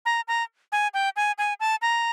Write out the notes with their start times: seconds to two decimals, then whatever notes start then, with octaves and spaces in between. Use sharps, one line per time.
0.06 A#5
0.28 A#5
0.72 G#5
0.94 G5
1.16 G#5
1.38 G#5
1.60 A5
1.82 A#5